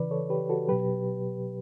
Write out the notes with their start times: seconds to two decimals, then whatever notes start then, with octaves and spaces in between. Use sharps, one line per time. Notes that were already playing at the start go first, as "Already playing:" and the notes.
Already playing: C#3 E3 B4 D5
0.11 A4 C#5
0.30 G4 B4
0.49 F#4 A4
0.68 B2 F#3 G4 B4